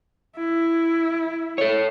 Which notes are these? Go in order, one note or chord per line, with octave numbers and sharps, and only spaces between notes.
E4
A4 C#5